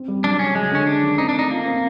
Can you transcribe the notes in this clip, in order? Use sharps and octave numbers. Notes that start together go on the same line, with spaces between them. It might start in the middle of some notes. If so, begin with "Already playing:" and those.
Already playing: C4
G3
F#3 D4
C#3 C#4
F#3 G#3
D3 C#4
G#3 D4
D#3
C4 D#4
D4
A3 D#4
A#3 F4
C4